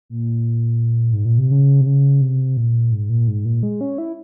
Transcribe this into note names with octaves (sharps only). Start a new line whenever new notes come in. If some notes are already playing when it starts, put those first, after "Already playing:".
A#2
G#2
A#2
C3
C#3
C3
C#3
C3
A#2
G#2
A#2
G#2
A#2
G#3
C#4
E4